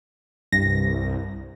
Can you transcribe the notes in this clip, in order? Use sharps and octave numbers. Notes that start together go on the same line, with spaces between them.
C2 G2 A#6